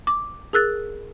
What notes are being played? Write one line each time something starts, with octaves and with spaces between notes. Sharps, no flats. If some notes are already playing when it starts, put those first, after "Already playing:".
D6
G#4 A#4 E6 F#6 A6